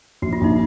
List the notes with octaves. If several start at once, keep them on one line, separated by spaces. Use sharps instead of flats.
A#1 F#4
F4
A#1 D#4